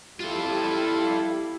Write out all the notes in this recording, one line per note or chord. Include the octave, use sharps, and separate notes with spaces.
G3 E4 F4 G4 A4